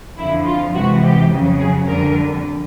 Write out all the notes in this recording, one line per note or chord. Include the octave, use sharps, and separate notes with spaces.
F2 D3 F3 E4
F4
C3 E3 G#3 F#4
G4
F2 C#3 F#3
G#4
F2 D3 G3 A#4